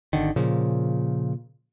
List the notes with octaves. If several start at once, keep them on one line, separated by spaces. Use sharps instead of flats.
G#1 D3 D#3
A#2 C#3 F3